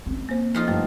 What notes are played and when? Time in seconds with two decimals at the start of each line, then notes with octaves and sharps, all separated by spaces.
0.06 C4 C#4
0.29 A#3 C5
0.55 F2 D#4 F4
0.68 G2 D3 A3